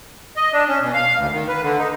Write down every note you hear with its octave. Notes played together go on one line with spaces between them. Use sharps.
D#5
D4
C#4
B2
F5
D2
D#3
B4
D3
D#4